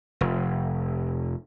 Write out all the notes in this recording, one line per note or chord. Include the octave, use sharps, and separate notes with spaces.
F1